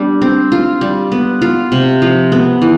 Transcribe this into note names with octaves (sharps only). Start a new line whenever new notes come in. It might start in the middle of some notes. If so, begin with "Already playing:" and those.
Already playing: G3 B3 D4
C4
F4
G3
B3
F4
C3
F3
B3
E3